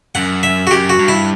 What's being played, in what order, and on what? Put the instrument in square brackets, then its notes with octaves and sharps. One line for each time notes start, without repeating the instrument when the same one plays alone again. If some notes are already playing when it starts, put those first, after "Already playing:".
[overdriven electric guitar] F#2 [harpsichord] F#5
[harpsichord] E5
F#4
[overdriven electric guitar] F#2 [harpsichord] G4
[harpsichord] F#4
[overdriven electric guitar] G2
[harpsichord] E4